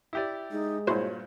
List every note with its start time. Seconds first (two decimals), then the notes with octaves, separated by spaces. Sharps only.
0.13 E4 G4 D5
0.51 G#3 D#4
0.87 G2 A#2 E4 F#4 C5 C#5